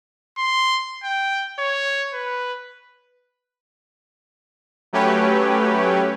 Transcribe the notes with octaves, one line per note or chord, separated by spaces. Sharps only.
C6
G5
C#5
B4
F#3 A3 C#4 G4 B4 C#5